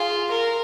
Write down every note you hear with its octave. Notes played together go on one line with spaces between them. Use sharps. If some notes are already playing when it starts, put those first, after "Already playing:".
Already playing: F4 G#4
A#4